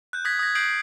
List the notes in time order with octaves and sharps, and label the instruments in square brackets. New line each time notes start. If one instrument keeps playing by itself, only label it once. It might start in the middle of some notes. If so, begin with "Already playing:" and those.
[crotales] F#6 G6
D#6 F#6 G#6 A#6 B6
D#6 G#6 A#6
D#6 G6 A#6 C7 D7 F#7